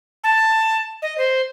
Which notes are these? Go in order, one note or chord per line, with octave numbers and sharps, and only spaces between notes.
A5
D#5
C5